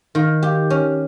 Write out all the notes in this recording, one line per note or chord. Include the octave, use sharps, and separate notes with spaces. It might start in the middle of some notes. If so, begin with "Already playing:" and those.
D#3
G4
C#4